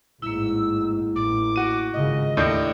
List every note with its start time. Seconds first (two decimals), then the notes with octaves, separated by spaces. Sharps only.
0.22 A1 G#2 A#3 E4 E6
1.16 A1 D6
1.56 F#4 D#7
1.94 G#1 C#3 F4 D#5
2.37 D#2 A2 D4 G6